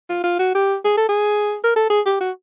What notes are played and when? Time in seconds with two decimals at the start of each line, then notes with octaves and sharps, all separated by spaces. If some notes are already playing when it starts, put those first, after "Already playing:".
0.09 F4
0.24 F4
0.39 F#4
0.55 G4
0.85 G#4
0.97 A4
1.09 G#4
1.64 A#4
1.76 A4
1.90 G#4
2.06 G4
2.21 F#4